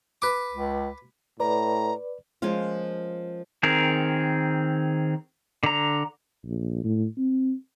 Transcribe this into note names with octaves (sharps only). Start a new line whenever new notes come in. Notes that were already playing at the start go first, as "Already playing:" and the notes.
B4 D6
C#2
A2 B4 D5 A#5
F3 G#3 A#3 C#4 F4
D#3 C4 G#4 A#4
D3 A#5
A#1
A2
C4